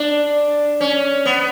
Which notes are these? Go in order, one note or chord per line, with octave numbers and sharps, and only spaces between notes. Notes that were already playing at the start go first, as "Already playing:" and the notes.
Already playing: D4
C#4
B3